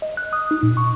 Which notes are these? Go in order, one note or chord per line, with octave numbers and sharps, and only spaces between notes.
D#5
F#6
D#6
D#4
A#2
C#6